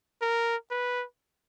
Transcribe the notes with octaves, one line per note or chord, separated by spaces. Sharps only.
A#4
B4